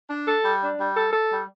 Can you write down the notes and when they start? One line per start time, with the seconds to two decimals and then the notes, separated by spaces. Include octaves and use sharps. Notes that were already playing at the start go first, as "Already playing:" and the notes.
0.09 D4
0.27 A4
0.44 G3
0.62 D4
0.79 G3
0.97 A4
1.13 A4
1.31 G3